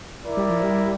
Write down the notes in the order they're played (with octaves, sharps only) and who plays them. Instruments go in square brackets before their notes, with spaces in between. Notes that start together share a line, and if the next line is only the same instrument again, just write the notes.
[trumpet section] E4 A#4 D5
[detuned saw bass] G3
F3
G3